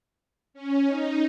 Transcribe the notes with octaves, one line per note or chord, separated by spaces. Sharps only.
C#4
D#4